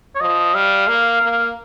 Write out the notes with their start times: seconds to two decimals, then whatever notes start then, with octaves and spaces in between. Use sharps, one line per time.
0.15 C#5
0.20 F3 D#5
0.55 G3 F5
0.88 A#3
1.22 A#3